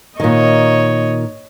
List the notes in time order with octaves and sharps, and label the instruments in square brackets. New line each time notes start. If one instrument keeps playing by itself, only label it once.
[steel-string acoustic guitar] A#2 D#3 [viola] C#5 D#5